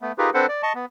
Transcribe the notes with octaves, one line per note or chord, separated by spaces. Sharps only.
A3 B3
D#4 F4 G4 G#4 A#4 B4
C4 D4 A4 B4 C5 F#5
D5
D#5 A5 C#6
B3